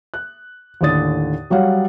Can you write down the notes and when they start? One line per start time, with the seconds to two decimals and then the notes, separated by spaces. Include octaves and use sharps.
0.14 F#6
0.81 D#2 A2 D3 D5 D#6 A6
1.50 F#3 G3 C#5 F5 F#5